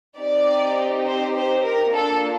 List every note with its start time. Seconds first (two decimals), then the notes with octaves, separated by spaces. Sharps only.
0.17 C4 D#4 G4 D5
1.06 C5
1.35 C5
1.64 A#4
1.94 A#3 D4 F4 A4